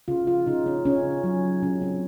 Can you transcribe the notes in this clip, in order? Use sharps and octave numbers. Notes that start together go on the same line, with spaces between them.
C#3 F4
F4
C#3 D#4
C#4
C#3 C#4
F#3
C#3 C#4
C4